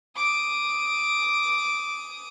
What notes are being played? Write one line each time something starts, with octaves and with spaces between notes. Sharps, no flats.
D6 D#6